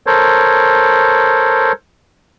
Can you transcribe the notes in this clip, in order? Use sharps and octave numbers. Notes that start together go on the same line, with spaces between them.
A4 A#4 C5 C#5